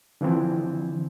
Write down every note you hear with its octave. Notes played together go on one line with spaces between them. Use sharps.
D3 E3 F3 C4 E4